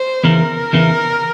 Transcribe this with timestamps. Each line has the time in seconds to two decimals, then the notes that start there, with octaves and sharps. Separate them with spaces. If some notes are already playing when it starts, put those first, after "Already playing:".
Already playing: C5
0.24 E2 C#3 E3 A#4
0.73 E2 C#3 E3